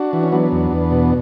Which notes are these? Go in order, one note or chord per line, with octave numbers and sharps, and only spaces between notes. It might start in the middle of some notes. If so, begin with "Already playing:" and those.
Already playing: D4 F#4
E3
C#4
F#3 B3 D4
E2
E2
B2